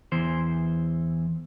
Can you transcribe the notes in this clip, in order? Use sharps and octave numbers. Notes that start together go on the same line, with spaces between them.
E2 E3 C5